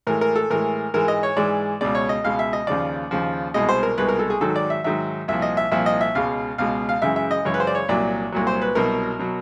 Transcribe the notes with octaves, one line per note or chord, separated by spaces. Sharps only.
A2 E3 G#3 A#4
A#4
A4
A2 E3 G#3 A#4
G#2 E3 G#3 A#4
D#5
C#5
G#2 E3 G#3 D5
C#2 B2 G#3 D5
C#5
D#5
C#2 B2 G#3 F5
E5
D#5
D#2 C#3 F3 D5
D#2 C#3 F3
C2 B2 G#3 D#5
C5
A#4
C2 B2 G#3 B4
A#4
A4
G#4
G#2 D#3 F#3 A4
D5
E5
G#2 D#3 F#3 E5
C2 A#2 F3 E5
D#5
E5
C2 A#2 F3 E5
D#5
E5
C#2 B2 G#3 F5
C#2 B2 G#3 F5
F5
F#2 C#3 E3 G#3 E5
E5
D#5
F#2 C#3 E3 G#3 C#5
B4
C5
D5
C#5
C2 A#2 F#3 D5
C2 A#2 F#3
C5
B4
C2 B2 F#3 A#4
B2 F#3